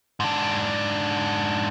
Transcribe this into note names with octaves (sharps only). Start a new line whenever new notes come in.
G#2 D4